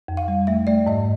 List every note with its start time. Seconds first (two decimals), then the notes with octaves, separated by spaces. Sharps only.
0.08 F2
0.17 F5
0.28 G3
0.47 A3 E5
0.67 A3 D5
0.86 G#2 D#5